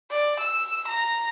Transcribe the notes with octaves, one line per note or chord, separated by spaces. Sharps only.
D5
E6
A#5